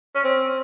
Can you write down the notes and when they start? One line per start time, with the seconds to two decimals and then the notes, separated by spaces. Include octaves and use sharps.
0.15 C#4
0.24 C4